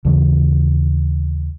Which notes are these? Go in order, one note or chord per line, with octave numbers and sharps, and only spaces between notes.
D#2 C#3 E3 F#3